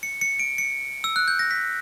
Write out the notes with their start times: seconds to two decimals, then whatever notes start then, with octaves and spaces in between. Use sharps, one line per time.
0.03 C#7
0.21 C#7
0.39 D7
0.58 C#7
1.04 E6
1.16 F#6
1.28 G6
1.39 A#6
1.51 B6